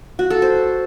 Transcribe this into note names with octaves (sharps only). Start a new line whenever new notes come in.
F#4
A4
C5